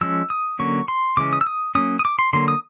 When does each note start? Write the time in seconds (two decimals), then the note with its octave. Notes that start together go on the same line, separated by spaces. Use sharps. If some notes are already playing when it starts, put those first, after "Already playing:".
0.01 F3 G#3 C#4 E6
0.30 D#6
0.59 D3 F#3 A#3 C#4 C#6
0.88 C6
1.17 C#3 E3 G#3 C#4 D6
1.33 D#6
1.41 E6
1.47 D#6
1.75 F#3 A#3 C#4 D#6
1.99 D#6
2.05 D6
2.19 C6
2.33 D3 F#3 A#3 C6
2.48 D#6